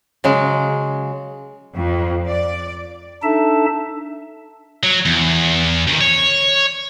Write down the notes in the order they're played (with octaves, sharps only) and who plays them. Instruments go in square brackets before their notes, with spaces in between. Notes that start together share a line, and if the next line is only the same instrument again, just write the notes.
[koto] C#3 F#3 G#3
[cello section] F2
D5
[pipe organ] D4 D#4 A4 E5 A5
[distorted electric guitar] F#3
E2
D2 D#3
C#5